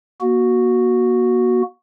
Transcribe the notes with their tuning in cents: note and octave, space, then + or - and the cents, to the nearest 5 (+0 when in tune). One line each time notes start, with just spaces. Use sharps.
A#3 +40 F#4 +0